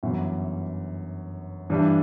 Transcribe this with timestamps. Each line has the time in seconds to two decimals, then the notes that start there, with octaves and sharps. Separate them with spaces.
0.03 G1 F#2 E3
1.70 G2 E3 G3 D4